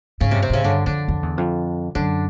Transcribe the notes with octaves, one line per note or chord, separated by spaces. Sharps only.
G#2 C#3 C#4
G2 C3 C4
C3 C4
G#2 C#3 C#4
G2 D3 D4
F2 D3 D4
F2
E2
F2
F#2 D3 D4